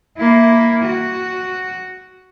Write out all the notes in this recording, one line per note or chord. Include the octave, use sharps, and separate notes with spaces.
A#3 E4
F#4